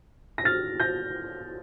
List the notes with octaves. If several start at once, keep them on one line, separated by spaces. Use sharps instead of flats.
A#6
F6 A6
G6 A#6